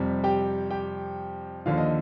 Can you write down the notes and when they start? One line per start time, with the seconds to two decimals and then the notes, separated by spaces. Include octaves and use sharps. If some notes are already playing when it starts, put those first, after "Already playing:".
Already playing: F2 C3 G3
0.24 G4 G5
0.71 G4 G5
1.66 D#2 D3 F3 F5
1.78 D#5